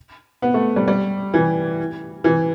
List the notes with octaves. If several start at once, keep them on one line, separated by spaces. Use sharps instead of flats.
B3
A3
G3
G3
E3
E3